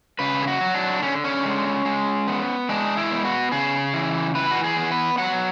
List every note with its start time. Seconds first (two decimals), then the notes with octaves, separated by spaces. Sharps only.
0.19 C#3 B4
0.42 G#4
0.47 F#4
0.61 F#3
0.74 D4
1.02 D3 C#4
1.24 C#4
1.45 G#3
1.85 G#3
2.28 B3
2.69 G#3 D4
2.97 E4
3.11 B3
3.25 F#4
3.52 C#3 G#4
3.94 E3
4.35 E3 B4
4.51 F#4
4.64 G#4
4.77 B3
4.92 B4
5.18 F#3 F#5